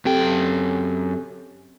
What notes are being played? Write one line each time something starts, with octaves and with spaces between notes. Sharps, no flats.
F#2 C4 G4 A4 G5